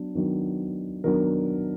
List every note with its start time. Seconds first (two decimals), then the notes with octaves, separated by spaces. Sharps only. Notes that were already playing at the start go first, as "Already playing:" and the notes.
Already playing: F#3 B3 D4
0.15 D#3 F#3 B3 D4
1.04 D#3 F#3 B3 D4 A#4